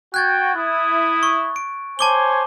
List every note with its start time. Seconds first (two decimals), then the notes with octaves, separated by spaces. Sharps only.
0.14 F#4 G5 F#6 G#6 A6
0.55 E4 D#6
1.23 C#6
1.56 D7
1.99 C5 C#5 G#5 A5 D6 G7